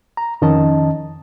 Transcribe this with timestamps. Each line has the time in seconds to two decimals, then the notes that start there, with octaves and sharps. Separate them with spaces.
0.17 A#5
0.42 F2 D#3 C#4 D#5 A5